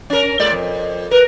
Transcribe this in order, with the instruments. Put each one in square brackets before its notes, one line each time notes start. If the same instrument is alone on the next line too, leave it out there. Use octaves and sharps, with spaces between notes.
[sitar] C#4 A#4
A#2 G#3 D5
F2
[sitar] A#4 [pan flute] B4